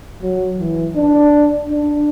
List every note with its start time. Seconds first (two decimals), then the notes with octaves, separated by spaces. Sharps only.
0.22 F#3
0.59 E3
0.96 D4
1.70 D4